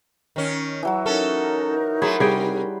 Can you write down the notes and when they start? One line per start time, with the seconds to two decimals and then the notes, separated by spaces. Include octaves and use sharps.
0.36 D#3 C#4
0.83 E3 F#3 F#4
1.06 C#4 D#4 A4 A#4
2.02 F#3 A3 G#4 B5 C6
2.20 C3 G3 G#4 G5